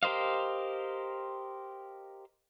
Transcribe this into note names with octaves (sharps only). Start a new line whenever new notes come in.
G4 A#4 C5 D#5 F5